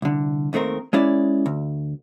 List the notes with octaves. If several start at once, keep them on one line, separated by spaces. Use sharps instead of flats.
C2 D3
D#2 D#3 A3 C4 A#4
G#3 C#4 E4 D5
D2